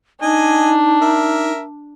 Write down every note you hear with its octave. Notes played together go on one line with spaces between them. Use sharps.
D4 D#4 D#5 G#5
A#4 E5